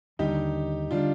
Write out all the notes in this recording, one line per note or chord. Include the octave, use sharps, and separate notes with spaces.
D#2 D3 G3 D#4 G4
D3 G3 D4 F4